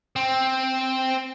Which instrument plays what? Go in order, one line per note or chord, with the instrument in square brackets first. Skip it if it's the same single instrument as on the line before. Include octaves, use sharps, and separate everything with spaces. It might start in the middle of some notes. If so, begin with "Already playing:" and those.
[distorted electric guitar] C4